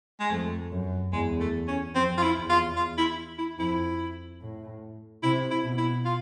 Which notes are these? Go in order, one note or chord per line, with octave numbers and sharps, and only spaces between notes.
G#3
F2 A3
F#2
E2 G#3
A3
C#4
F2 C4
F4
E4
E2
F4
F4
E4
E4
F2 E4
A2
C3 E4
E4
B2
E4
F4